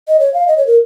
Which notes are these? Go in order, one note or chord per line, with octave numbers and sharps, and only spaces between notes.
D#5
C#5
F5
D#5
C#5
A#4